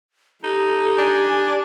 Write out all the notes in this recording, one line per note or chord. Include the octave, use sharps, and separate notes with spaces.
D#4 G4 A4
D4 G#5